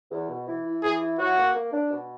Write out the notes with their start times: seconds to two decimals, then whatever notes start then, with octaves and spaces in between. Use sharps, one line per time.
0.11 E2
0.29 B2
0.47 E3
0.65 E4
0.83 E3 G#4
1.00 E4
1.19 F#3 F#4
1.37 A#3
1.54 A#3
1.72 D4
1.90 B2